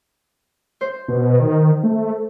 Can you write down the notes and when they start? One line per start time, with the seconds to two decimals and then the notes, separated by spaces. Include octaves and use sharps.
0.81 C5
1.08 B2
1.40 D#3
1.83 A3